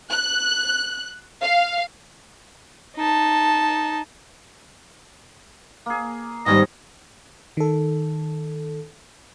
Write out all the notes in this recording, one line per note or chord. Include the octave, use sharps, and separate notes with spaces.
F#6
F5
D#4 A5
A#3 G#4
G#2 D#3 G3 B3 C#4 C5 D#5
D#3 A4